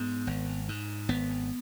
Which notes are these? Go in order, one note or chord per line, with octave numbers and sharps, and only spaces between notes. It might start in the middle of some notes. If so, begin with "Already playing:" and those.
Already playing: G#2 B3
G#1
G#2
G#1 B3